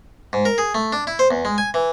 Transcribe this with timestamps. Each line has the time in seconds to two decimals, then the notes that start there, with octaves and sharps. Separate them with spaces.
0.33 G#2
0.45 A#4
0.58 G#4
0.74 A3
0.93 D4
1.07 E4
1.19 C5
1.31 E2
1.45 G#3
1.58 G#5
1.74 E3